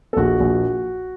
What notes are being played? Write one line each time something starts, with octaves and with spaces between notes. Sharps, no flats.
A4
A#1 F#4
A#1